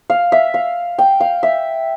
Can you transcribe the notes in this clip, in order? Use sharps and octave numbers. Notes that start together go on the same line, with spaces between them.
F5
E5
F5
G5
F5
E5